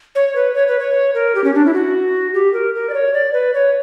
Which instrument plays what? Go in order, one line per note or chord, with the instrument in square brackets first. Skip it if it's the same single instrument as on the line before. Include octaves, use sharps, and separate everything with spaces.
[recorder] C#5
B4
C#5
B4
C#5
A#4
G4
C#4
D4
E4
F#4
G4
A#4
A#4
D5
C#5
D5
B4
C#5